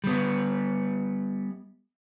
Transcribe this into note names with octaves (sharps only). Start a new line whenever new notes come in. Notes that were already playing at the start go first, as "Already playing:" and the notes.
G3 B3